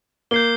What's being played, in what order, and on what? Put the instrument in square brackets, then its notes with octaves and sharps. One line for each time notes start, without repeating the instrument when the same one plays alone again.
[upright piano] A#3 [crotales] G6 C7 G7